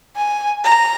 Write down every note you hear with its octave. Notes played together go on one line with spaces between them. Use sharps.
G#5
A#5